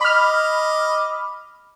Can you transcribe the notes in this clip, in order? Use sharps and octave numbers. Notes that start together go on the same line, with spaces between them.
D#5 B5 D6 F6